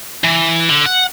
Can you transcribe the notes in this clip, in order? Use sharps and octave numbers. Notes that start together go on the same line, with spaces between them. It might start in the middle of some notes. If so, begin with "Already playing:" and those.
E3
D3
F#5